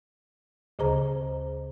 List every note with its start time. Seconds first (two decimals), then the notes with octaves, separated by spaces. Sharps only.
0.79 D2 C#3 G#4 C5 A#5